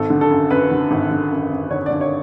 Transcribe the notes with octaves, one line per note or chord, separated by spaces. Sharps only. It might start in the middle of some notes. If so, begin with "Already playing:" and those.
Already playing: G#1 A4
D3
A4
F#2
F#2 B4
D3
G#1
D3
F#2
F#2
D3 C#5
D3 D5
C#5